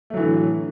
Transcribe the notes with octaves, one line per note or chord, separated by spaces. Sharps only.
A2 D3 E3 F#3 A3